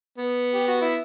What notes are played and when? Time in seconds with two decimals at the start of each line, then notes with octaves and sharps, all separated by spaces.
0.18 B3
0.54 G4
0.68 F#4
0.81 E4